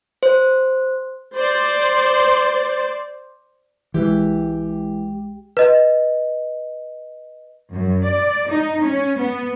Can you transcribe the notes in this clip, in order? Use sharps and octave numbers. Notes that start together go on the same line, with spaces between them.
C5
C5 D5
B1 E3 G#3 G4
B4 D#5
F#2
D5
D#4
C#4
B3